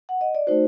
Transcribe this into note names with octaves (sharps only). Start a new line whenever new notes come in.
F#5
D#5
D5
A3 D#4 F#4 C5